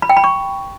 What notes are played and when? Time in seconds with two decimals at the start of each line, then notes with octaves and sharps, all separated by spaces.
0.02 B5
0.09 G5
0.17 B5
0.24 C#6